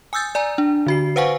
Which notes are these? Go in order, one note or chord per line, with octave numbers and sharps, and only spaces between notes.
G#5 D#6 E6 G6 A6
D5 G#5 A#5
D4
D3 F#4 C7
B4 C5 F5 F#5 G#5 C#6